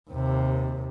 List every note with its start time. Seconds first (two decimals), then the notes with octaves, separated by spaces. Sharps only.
0.10 D#2 C3